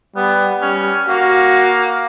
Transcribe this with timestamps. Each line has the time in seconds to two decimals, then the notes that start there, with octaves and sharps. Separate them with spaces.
0.15 G3 B3
0.62 G3 C#4
1.08 A#3 F#4